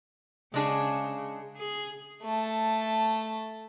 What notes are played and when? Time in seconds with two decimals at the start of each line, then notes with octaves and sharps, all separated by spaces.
0.54 C#3 G#3 D4 G#4
1.57 G#4
2.23 A3 A5